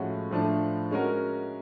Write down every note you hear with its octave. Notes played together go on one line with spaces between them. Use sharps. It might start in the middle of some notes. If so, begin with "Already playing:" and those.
Already playing: A2 F3 G#3 C#4 F#4
A2 F3 A3 D4
G#3 C#4 F#4 A#4